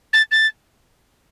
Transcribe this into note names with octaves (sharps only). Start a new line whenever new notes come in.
A6
A6